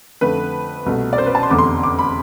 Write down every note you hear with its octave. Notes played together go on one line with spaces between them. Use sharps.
F2 D3 A3 B4
C2 B2 A3
D5
C5
B4
A5
C6
F1 E2 D3 A3 D6
C6
D6
B5